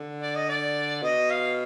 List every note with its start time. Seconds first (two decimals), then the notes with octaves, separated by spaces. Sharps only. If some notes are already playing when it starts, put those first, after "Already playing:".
Already playing: D3
0.22 D5
0.36 D#5
0.49 D5
1.02 B2 D#5
1.30 F5